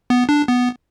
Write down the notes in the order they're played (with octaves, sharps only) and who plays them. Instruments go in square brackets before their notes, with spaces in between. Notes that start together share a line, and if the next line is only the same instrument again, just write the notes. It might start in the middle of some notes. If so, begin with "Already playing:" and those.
[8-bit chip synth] B3
D4
B3